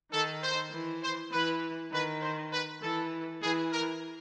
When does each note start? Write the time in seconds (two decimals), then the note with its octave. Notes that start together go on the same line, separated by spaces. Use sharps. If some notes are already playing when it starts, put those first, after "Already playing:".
0.12 D#3 A4
0.42 C5
0.71 E3
1.02 C5
1.31 E3 B4
1.91 D#3 B4
2.22 C5
2.52 B4
2.81 E3 A4
3.41 E3 G#4
3.72 A#4